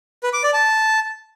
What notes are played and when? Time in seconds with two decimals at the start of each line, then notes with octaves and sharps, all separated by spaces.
0.23 B4
0.33 D6
0.43 D5
0.53 A5